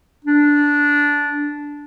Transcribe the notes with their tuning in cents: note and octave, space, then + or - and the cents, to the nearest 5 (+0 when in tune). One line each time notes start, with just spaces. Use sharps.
D4 -10